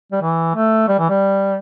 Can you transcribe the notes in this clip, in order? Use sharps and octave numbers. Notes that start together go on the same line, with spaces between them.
G3
E3
A3
G3
E3
G3